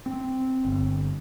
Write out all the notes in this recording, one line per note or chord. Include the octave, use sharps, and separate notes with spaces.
C4
G1